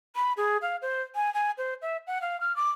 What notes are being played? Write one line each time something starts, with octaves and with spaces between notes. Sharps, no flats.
B5
G#4
F5
C5
G#5
G#5
C5
E5
F#5
F5
F6
D6